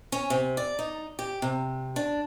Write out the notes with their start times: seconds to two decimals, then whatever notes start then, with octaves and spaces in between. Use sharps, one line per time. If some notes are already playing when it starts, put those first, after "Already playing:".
0.12 C#4
0.30 C3
0.57 D5
0.79 D#4
1.19 G4
1.42 C3
1.96 D4